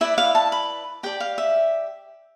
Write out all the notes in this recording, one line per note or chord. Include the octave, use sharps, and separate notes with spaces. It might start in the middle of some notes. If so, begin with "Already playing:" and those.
E4 B4 D5 E5
F5
A5
B5
G4 D5 G5
F5
E5